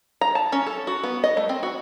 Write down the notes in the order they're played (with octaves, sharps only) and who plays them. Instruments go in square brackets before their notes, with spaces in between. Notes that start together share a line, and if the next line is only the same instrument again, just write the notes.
[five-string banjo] A#5
A5
C#4
A4
F#4
B3
D#5
A3
C4
F#4